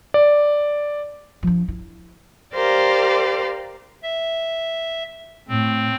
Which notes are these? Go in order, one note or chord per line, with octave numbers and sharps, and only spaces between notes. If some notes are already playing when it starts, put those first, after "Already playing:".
D5
F3 D4
E4
G4 A#4 C5 D5 F5
E5
A2 C4